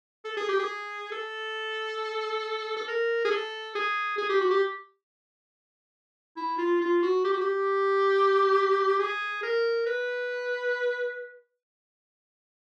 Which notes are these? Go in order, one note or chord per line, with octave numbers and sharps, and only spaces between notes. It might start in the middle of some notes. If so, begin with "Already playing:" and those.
A4
G#4
G4
G#4
A4
A4
A#4
G#4
A4
G#4
G#4
G4
F#4
G4
E4
F4
F4
F#4
G4
F#4
G4
G#4
A#4
B4